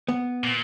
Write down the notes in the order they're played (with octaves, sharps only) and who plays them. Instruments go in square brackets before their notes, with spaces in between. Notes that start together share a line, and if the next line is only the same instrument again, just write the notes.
[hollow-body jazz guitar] B3
[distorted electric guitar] A#2